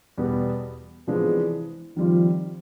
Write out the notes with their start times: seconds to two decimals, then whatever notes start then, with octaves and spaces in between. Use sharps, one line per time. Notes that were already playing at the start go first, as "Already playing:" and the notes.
0.18 E2 B2 G3 B3
1.07 C3 E3 F3 G#3 B3 D4
1.97 D#3 F3 G3 C4 F4